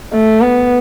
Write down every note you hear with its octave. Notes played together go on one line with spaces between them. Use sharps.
A3
B3